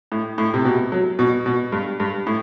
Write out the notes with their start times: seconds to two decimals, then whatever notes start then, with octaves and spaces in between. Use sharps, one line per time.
0.12 A2
0.38 A2
0.54 C3
0.65 B2
0.92 F#3
1.19 B2
1.46 B2
1.72 G2
2.00 G2
2.27 A2